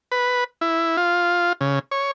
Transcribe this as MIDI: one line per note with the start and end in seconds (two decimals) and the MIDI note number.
0.12 0.44 71
0.61 0.97 64
0.97 1.53 65
1.61 1.79 49
1.91 2.11 73